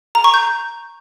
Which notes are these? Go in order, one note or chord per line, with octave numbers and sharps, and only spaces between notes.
A#5
C#6
G6